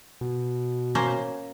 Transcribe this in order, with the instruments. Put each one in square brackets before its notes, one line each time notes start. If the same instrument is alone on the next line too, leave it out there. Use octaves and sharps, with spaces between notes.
[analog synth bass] B2
[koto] A#3 C#4 C5